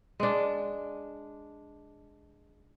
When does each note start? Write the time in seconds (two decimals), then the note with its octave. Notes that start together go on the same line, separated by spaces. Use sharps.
0.20 G#3 D4